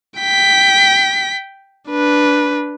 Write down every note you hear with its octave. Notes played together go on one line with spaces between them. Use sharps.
G5 B6
D4 B4